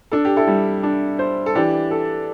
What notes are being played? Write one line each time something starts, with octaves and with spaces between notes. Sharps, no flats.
D4 A4
G4
E4 A4
G3
D4
C5
A4
E3 D4 G4
A4